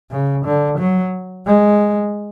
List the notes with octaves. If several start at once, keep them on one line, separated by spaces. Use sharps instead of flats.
C#3
D3
F#3
G#3